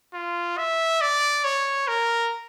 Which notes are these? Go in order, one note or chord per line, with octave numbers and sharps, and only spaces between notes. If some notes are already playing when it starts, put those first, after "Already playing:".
F4
E5
D5
C#5
A#4